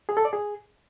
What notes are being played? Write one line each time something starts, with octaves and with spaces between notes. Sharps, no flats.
G#4
A4
D5
G#4